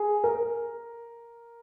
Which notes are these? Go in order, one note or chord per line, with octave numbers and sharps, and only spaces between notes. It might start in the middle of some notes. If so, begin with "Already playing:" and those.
Already playing: G#4
A#4